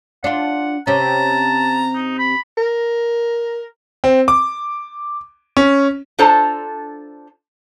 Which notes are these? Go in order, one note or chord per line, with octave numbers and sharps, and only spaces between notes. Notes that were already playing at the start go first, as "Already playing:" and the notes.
D4 F4 F#5
C3 C#4 A5 A#5
D#4
B5
A#4
C4
D6
C#4
D4 F4 A4 C5 A5 A#5